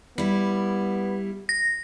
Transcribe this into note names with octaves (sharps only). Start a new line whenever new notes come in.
G3 B3 E4
A#6